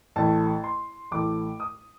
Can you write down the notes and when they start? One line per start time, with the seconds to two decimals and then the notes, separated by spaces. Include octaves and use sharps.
0.16 A1 A2 A3 A5
0.64 C6
1.11 A1 A2 A3 D6
1.60 D#6